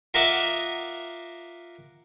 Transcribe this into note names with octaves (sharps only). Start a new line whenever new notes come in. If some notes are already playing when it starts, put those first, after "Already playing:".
F4 A#4 D#5 E5 F#5 D6